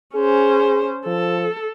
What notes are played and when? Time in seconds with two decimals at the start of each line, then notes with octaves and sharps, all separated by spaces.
0.15 C#4 G#4 C5
1.06 F3 A4